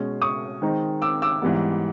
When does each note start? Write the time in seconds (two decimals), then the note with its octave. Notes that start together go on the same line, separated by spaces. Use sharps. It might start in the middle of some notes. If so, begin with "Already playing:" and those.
Already playing: B2 G#3 C#4
0.22 C#6 D#6
0.62 D#3 G#3 C4 D#4
1.02 D6 E6
1.22 D6 E6
1.42 G#2 E3 G3 B3